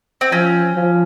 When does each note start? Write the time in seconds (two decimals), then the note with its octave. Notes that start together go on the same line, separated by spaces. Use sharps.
0.21 C4
0.32 F3 C#4
0.74 F3